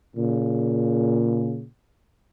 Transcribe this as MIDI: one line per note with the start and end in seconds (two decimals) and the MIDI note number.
0.16 1.66 46
0.16 1.66 49